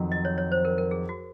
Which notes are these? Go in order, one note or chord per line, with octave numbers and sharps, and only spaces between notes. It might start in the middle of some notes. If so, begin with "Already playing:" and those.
Already playing: F2 D#3 F#3
D#5
C#5
C#5
C5
A#4
A#4
G#4
F#4